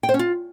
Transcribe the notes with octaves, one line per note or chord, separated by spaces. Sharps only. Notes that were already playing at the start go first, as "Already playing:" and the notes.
G5
C5
C#4
F4